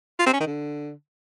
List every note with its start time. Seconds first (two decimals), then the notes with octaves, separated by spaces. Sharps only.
0.19 F4
0.26 C4
0.33 C#4
0.40 D#3
0.47 D3